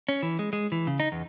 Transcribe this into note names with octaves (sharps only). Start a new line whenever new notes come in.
C#4
E3
G#3
G#3
E3
C#3
D#4
E2